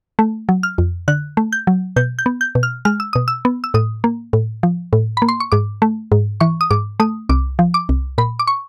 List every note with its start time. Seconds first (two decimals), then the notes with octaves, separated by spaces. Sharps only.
0.19 A3
0.49 F#3
0.63 F6
0.78 F2
1.08 D3 F#6
1.37 A3
1.53 G6
1.67 F#3
1.96 B2 G6
2.19 G6
2.26 B3
2.41 G6
2.55 B2
2.63 F6
2.85 G#3 F6
3.00 E6
3.13 B2 D#6
3.28 E6
3.45 B3
3.64 E6
3.74 A2 D#6
4.04 A#3
4.33 A2
4.63 F3
4.93 A2
5.17 A#3 B5
5.29 C6
5.40 C#6
5.52 G#2 D6
5.82 A3
6.12 G#2
6.40 E3 C#6
6.61 D#6
6.71 G#2 D6
7.00 A3 D#6
7.29 C2 D6
7.59 F3
7.74 D6
7.89 C2
8.18 A#2 B5
8.39 D6
8.47 C#6